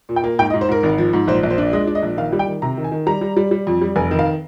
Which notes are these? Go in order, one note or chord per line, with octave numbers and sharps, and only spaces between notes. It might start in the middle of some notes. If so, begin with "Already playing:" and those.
A#2
G5
A#3
G#2 G5
D#5
G#2
C5
G#2 A#4
G#1
F3
G#2
A#1 C5
A#1
C5
D4
G#3 D#5
D4
D#5
A#1
D#3 F5
G3
G5
D#3
C3 A#5
D#3
G#5
D#3
G3 A#5
G3
G3
G3
F2
G3
F1 G#5
D#3
F5